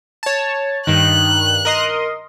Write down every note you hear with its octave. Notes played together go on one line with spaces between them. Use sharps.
C#5 A5
G2 D#3 F#6
A#4 D#5 C6